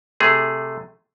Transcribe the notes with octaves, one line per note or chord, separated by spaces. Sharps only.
C3 A3 G#4